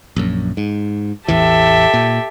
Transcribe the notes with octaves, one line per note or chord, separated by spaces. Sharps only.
A#1 F#2
G#2
A1 E2 E3 G4 A4 E5
A#2